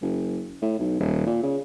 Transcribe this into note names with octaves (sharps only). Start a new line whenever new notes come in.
F#1
A2
B1
D#1
A#2
C#3